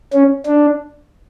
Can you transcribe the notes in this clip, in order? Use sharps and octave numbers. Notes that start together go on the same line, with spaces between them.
C#4
D4